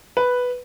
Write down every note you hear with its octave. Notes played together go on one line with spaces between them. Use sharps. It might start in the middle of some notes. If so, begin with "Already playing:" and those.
B4